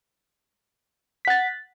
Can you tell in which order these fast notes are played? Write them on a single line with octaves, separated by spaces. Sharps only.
B6 F#5 A6